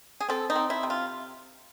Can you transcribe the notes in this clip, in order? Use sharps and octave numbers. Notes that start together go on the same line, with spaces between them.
G#4
C4 A4
D#4
C4
E4
C3
F4